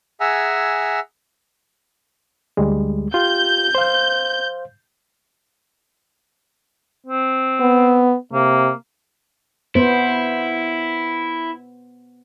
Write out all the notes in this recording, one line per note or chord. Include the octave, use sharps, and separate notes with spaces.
G#4 E5 F#5 G#5 A#5 E6
D2 G3 G#3
F4 G4 G6
C5 F5
C4
B3
C3 A#3
B3 E4 C5